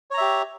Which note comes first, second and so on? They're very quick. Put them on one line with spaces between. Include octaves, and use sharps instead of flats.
C#5 A#5 E5 G4